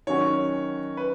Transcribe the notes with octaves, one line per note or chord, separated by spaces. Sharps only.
D#3 F#3 C#4 F#4 C#5
B4